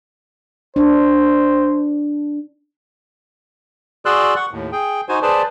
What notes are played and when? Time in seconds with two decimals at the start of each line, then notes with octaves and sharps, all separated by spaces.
0.76 D4 C5
4.06 F#4 G#4 D5 C6 E6 F#6
4.36 F#5 C#6
4.51 D#2 A2
4.72 G#4 G5
5.09 D#4 F#4 C5 G#5
5.22 G#4 B4 C5 D5 A5